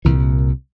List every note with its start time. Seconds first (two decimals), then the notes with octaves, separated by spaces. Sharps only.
0.05 C2 A#2 E3